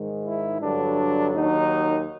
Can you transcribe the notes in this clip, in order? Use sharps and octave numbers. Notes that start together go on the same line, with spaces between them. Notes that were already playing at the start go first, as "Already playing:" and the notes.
Already playing: G#2 D#3 G#3
E4
G2 D3 F#3 D4
D#2 D#3 F#3 D#4